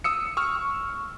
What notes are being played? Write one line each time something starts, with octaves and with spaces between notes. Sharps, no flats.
D#6 E6 C#7
C#6 E6 F6